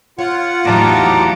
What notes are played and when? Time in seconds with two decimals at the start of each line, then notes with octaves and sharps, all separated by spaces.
0.19 F4 C#5 F#5
0.65 E2 A2 F#3 D#4 G4 A5 A#5 D6